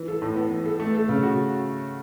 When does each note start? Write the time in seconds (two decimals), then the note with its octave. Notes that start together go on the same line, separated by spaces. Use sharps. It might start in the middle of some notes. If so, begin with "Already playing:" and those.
Already playing: E3
0.08 A4
0.22 A2
0.36 B3
0.51 E3
0.66 A4
0.80 A3
0.95 A4
1.09 C#3
1.23 F#4